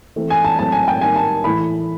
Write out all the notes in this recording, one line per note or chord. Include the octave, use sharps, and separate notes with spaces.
E3 A3 C4
G#5
A5
A2 F#3 A3 C4 A5
G#5
G5
D#3 G3 A#3 G#5
A5
A2 E3 A3 B5